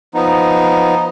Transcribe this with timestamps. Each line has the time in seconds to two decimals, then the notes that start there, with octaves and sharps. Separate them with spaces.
0.14 F3 B3 D#4